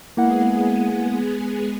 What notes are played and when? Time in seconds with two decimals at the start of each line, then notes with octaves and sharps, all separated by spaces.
0.17 G#3 A#3 B3 E4 G#4 F#5